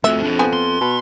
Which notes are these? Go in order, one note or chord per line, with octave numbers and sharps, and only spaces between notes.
F2 A3 F#4 E5
D4 G#4
F3 B3 G#5
C6
B2